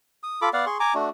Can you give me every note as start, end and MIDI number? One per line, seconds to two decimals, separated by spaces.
0.23 0.40 87
0.42 0.49 65
0.42 0.49 69
0.42 0.49 83
0.42 0.49 86
0.53 0.65 59
0.53 0.65 74
0.53 0.65 77
0.53 0.65 78
0.66 0.78 68
0.66 0.78 84
0.66 0.78 85
0.80 0.94 80
0.80 0.94 82
0.80 0.94 86
0.94 1.09 57
0.94 1.09 62
0.94 1.09 66